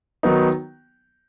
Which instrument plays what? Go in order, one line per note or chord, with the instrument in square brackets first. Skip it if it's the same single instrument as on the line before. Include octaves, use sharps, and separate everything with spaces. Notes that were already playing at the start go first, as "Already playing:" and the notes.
[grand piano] D#3 F#3 B3 D#4